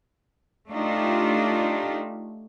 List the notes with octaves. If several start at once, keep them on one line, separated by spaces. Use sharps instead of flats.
A3 D4 D#4 F4 G4